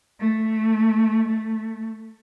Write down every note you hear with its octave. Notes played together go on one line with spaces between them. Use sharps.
A3
A3